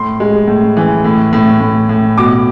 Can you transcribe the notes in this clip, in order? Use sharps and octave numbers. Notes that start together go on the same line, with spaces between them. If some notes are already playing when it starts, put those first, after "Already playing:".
Already playing: A2 C6
G#3
A2
E3
A2
A2
A2
A2
B2 D6